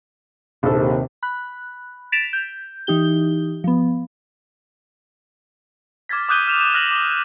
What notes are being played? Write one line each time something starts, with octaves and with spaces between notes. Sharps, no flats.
A#1 D#2 C3 A4
B5 F#6
A6 B6 D7 E7 F7
G6
E3 D#4 G4 G7
F3 B3
D6 F6 G#6 A6 B6
D6 D#6 F#6 G6 D#7 G7
F6 G6 E7 F7
G6 E7
F6 F#6 A#6 F7 F#7
D6 G7